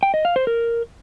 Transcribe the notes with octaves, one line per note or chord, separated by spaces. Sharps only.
G5
D#5
F5
C5
A#4